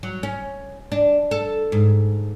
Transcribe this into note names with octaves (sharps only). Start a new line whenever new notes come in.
F#3
C#4
D4
A4
G#2